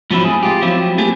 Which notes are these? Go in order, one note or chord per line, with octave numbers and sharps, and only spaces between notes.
G#2 F3 F#3 C4 E4
A2 G#4
F4 G4
F3 F#3 C4 E4
A3 A#3 G4 G#4